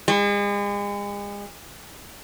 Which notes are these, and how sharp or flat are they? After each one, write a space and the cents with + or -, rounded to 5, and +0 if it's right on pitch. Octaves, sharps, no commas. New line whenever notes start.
G#3 -40